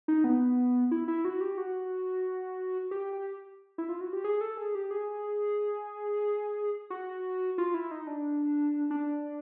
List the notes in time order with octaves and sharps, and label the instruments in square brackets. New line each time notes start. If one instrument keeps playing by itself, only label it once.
[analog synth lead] D#4
B3
E4
E4
F#4
G4
F#4
G4
G4
E4
F4
F#4
G4
G#4
A4
G#4
G4
G#4
F#4
F4
E4
D#4
D4
D4